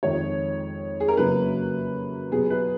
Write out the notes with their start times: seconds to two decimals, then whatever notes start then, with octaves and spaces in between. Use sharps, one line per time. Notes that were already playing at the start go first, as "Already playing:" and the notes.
0.03 F2 D#3 G#3 C#5
1.00 G#4
1.08 A#4
1.17 F#2 C#3 F#3 A#3 B4
2.32 B2 F#3 B3 G#4
2.50 B4